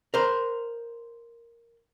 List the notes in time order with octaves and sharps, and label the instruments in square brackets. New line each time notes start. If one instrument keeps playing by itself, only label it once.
[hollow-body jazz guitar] A#4 C5